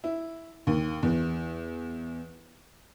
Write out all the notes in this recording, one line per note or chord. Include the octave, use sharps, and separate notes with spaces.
E4
D#2
E2